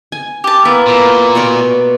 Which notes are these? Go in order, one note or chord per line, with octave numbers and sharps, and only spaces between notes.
G#5
G4 A5
A#3 B3 E4
A#2
B2 C#5 D5